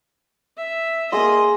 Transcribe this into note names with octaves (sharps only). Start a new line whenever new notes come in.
E5
A#3 G#4 D#5 C6